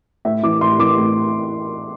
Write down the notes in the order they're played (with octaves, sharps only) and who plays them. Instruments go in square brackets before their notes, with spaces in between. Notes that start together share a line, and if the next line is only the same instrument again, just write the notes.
[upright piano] A2 E5
E3 D6
A2 C6
E3 D6
A2